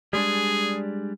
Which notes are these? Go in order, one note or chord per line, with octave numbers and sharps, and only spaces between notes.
G3 G#3 D4 G#4